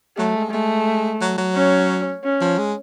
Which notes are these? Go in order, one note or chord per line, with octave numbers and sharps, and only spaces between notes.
F#3 A3
G#3
G#3 A3
F#3
F#3
C#4
C#4
F3
G#3